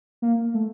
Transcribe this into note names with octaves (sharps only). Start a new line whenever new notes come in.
A#3
A3